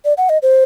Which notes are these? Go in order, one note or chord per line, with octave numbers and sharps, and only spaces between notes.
D5
F#5
D#5
C5